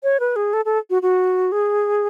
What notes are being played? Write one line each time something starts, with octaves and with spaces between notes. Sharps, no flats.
C#5
B4
G#4
A4
A4
F#4
F#4
G#4